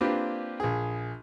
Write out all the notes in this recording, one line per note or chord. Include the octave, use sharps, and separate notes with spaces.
A#3 C4 D4 F4 G4 B4
A#1 G#4